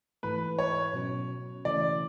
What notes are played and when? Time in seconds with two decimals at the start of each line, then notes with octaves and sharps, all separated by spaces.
0.23 G#2 E3 A3 B4
0.59 C#5
0.94 B2 F#3 C#4
1.65 C#3 E3 A3 C#4 D5